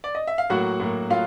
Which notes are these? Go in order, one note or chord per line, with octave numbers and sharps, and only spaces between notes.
D5
D#5
E5
F5
A2 F#3 A#3 F#4 F#5
A2 F#3 A#3
A2 F#3 F4 F5